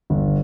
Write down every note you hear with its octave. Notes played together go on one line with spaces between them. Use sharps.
G1